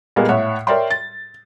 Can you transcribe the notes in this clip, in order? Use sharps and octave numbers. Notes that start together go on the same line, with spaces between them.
A#2 G3 G#3 A#3 B3
A2 C#5 E5 F#5
A#4 C#5 D5 E5 G5 C6
A6